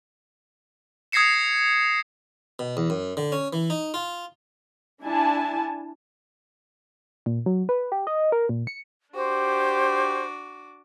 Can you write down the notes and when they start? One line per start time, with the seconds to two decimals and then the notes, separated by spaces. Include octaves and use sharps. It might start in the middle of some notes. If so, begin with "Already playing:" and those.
1.12 D#6 G#6 A#6 C7 C#7 E7
2.59 B2
2.77 E2
2.90 F#2
3.17 D3
3.32 C#4
3.53 E3
3.70 D#4
3.94 F4
5.04 D4 E4 G#5 A5
7.26 A#2
7.46 F#3
7.69 B4
7.92 G4
8.07 D#5
8.32 A#4
8.49 A#2
8.67 C#7
9.16 D4 F#4 G4 C5 D6